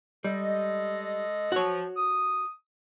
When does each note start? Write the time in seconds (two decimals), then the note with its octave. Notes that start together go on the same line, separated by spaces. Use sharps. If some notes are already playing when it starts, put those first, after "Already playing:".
0.24 G3 G#3 A4 D#5
1.52 F3 F#4 C#5
1.96 D#6